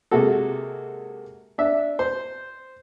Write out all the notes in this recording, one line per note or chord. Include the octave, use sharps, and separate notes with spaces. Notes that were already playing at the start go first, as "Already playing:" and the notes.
C3 G#3 A#3 F#4 A4
D4 E5
C5